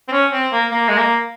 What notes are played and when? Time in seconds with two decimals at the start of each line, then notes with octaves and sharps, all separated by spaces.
0.08 C4
0.12 C#4
0.33 C4
0.52 A#3
0.72 A#3
0.89 G#3
0.98 A#3